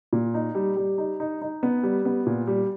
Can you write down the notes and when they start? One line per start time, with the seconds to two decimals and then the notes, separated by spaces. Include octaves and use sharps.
0.13 A#2
0.34 D#4
0.55 G3
0.77 G3
0.98 D#4
1.20 D#4
1.42 D#4
1.63 B3
1.83 G3
2.05 B3
2.26 A#2
2.47 G3